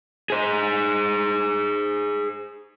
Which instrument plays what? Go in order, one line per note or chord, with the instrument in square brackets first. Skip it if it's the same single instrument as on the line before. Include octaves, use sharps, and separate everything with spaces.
[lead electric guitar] G#4 C5